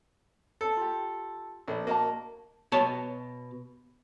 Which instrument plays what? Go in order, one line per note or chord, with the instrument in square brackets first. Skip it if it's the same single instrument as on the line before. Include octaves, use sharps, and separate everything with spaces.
[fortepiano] A4
[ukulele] F4 G4
[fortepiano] A#1 [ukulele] A4 B4
[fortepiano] A#3 [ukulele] F#4 D#5 A5
[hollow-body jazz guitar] B2 C#5 A5